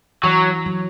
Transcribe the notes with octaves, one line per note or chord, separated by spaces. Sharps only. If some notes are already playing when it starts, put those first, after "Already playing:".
E3 F#3
F#3